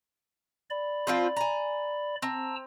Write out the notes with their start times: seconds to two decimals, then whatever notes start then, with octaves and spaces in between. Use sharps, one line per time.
0.70 D5 B5
1.07 F3 C4 F4
1.36 G#5 A#5
2.22 C4 A5 A#5 E6